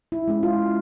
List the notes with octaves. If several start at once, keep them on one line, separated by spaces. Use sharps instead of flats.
E4
G#3 C#4 E4
F4